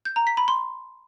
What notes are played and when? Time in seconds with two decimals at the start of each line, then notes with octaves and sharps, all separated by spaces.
0.05 G6
0.16 A#5
0.27 B6
0.37 B5
0.48 C6